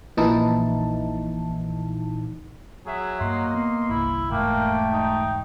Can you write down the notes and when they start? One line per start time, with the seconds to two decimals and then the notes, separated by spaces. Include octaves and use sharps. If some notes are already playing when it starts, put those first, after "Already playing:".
0.17 A#1 A#2 E3 D#4 E4 A5
2.86 F#3 G#4 E5
3.21 G2 A#3 D#5 C6
3.54 B3
3.89 G1 C2 E4
4.31 E1 G#2 A3 A#3 G5
4.92 D#4